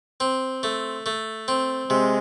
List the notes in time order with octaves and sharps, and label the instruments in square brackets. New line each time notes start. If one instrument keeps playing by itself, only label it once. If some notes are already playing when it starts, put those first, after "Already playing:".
[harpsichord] C4
A3
A3
C4
[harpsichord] C3 [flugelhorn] G#3